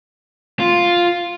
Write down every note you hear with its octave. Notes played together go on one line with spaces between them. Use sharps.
F4